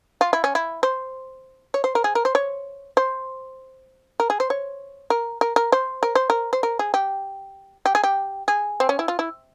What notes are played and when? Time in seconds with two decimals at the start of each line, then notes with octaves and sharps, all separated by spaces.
0.21 F4
0.33 E4
0.44 C#4
0.55 E4
0.83 C5
1.74 C#5
1.84 C5
1.95 A#4
2.04 G#4
2.15 A#4
2.25 C5
2.35 C#5
2.97 C5
4.20 A#4
4.30 G#4
4.40 C5
4.50 C#5
5.10 A#4
5.41 A#4
5.56 A#4
5.72 C5
6.03 A#4
6.15 C5
6.30 A#4
6.53 C5
6.63 A#4
6.79 G#4
6.94 G4
7.86 G4
7.95 G#4
8.04 G4
8.48 G#4
8.80 C4
8.89 C#4
8.99 E4
9.08 F4
9.19 E4